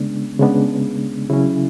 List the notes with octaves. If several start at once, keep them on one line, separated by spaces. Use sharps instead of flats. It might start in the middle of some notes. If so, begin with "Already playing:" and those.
Already playing: C#3 G#3 B3 D4
C#3 G#3 B3 D4
C#3 F#3 C#4 E4